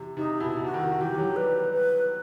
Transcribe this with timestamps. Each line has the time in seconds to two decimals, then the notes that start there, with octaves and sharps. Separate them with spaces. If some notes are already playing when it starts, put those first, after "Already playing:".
Already playing: C3 E3
0.17 C3 D#4
0.40 B2 E4
0.57 B2
0.64 C3 F#4
0.74 D#3
0.82 C3
1.01 E3 G4
1.14 E3
1.18 F#3
1.36 G3 B4
1.72 B4